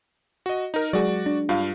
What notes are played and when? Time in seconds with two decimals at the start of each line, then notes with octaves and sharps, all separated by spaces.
0.46 F#4 D#5
0.74 D#4 A#4
0.93 F#3 G#3 F#4 G#4 D5
1.26 D4
1.49 G2 F4 F5